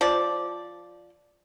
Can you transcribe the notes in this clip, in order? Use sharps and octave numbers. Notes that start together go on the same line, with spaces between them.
F3 D5